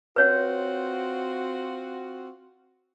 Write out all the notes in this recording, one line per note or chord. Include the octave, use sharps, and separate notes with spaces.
C4 F4 F#4 B4 C#5 F#5